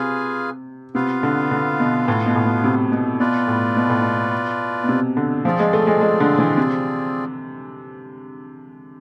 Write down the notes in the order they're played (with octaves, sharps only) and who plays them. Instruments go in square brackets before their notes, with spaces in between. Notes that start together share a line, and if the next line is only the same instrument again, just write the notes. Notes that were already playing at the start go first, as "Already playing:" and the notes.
Already playing: [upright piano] C3 [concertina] F4 G#4 B4 F5 G#5
[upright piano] C3 [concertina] B3 F4 B4 F5
[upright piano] D3
D3
B2
A2
B2
A2
B2
C3
B2
[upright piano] B2 [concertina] F4 B4 D5
[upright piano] A2
B2
A2
B2
B2
C3
D3
[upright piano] F3 [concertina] C4 F4 G#4 D5
[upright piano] G#3
A3
G#3
G#3
D3
E3
C3